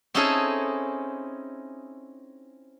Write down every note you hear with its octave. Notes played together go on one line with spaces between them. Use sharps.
C4 C#4 D#4 E4 G#4 A4